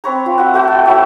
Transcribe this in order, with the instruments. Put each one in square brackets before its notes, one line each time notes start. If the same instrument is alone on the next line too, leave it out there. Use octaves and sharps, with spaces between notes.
[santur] C4 B4 C#5 A#5
F4
F#4 E5 F#5
A3 F#4 G5
A5
F#3 E4 F#4 E5